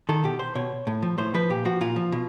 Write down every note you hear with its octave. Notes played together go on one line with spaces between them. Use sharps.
D#3 A4
B2 G4
C5
B2 C#5
A2
F3
A2 C5
F3 B4
A#2 G4
F3 F#4
A#2 F4
F3
B2